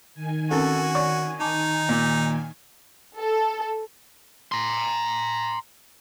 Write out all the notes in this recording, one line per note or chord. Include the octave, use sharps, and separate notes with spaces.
D#3 G#5
C4 C#4 F#4 A4 A#4
C#5 D5 C#6
D#4 A5 D6
A#2
A4
A#5 C6